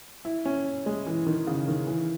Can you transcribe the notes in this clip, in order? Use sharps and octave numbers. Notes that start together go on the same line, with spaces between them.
E4
C#4
G#3
E3
D#3
C#3
D#3
E3